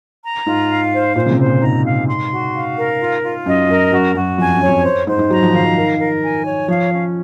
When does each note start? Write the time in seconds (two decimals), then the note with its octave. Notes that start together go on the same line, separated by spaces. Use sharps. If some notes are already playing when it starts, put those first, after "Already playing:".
0.23 A#5
0.46 G#2 F4
0.70 F5
0.92 C5
1.16 A#2 C5
1.26 C#3
1.31 C3
1.39 C5
1.46 A#2
1.61 G#2 A#5
1.85 F5
2.07 C6
2.31 F#4
2.54 F5
2.77 A#4
3.00 F4
3.23 F4
3.46 F#2 D#5
3.69 F#2 A#4
3.91 F#2 F#4
4.15 F#2 F#4
4.38 F2 G#5
4.54 F#2
4.61 C#5
4.68 F2
4.84 C5
5.07 G#2 C5
5.19 G#2
5.31 F#3 A#5
5.42 F3
5.53 D#3 F5
5.65 D#3
5.76 A#4
6.00 A#4
6.23 G#5
6.46 C#5
6.68 F3 F5
6.91 C#4